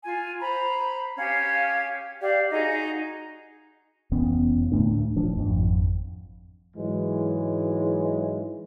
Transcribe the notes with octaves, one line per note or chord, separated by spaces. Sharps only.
F4 G#5
C5 A#5 B5
C#4 G4 F5 G#6
G4 D5 F5
D#4 F#4 G#4 D#5
F1 E2 B3 C#4
D2 A2 A3 D4
D#1 F3 D4
G#1 F2
G#2 E3 F#3 G#3